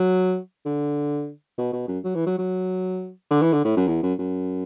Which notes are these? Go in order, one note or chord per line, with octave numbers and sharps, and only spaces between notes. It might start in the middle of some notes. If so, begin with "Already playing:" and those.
Already playing: F#3
D3
B2
B2
F#2
F#3
E3
F#3
F#3
D3
E3
D3
A2
F#2
E2
F#2
F#2